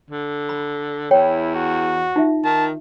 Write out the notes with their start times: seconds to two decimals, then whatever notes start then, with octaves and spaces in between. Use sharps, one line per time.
0.10 D3
0.49 B5
1.11 E2 E4 C#5 G5
1.55 F#4
2.16 D#4 F4 E5
2.44 D#3 A5